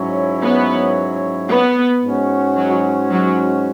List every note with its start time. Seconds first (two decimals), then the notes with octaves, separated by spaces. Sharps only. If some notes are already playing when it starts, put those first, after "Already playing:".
Already playing: G#2 F#3 C#4 E4 C#5
0.43 B3
1.49 B3
2.03 G#2 G#3 C#4 F#4
2.56 F#3
3.11 F#3